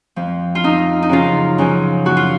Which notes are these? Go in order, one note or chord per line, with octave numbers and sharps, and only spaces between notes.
F2 F3
F4
F2 F3 D#4
D#4
F#2 C#3 F3 F4
F#2 C#3 F3
A#2 F3 F#4
F4